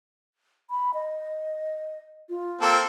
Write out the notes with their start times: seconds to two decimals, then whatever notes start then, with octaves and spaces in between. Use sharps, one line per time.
0.70 B5
0.94 D#5
2.29 F4
2.61 A#3 C4 A4